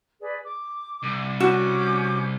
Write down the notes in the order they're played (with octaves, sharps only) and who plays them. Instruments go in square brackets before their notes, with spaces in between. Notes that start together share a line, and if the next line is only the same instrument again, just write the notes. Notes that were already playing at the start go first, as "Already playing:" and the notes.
[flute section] G#4 B4 D5
D6
[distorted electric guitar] C2
[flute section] C#4 D6 G6 [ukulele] F#4